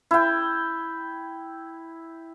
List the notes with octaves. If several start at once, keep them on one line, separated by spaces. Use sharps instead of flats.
E4 G5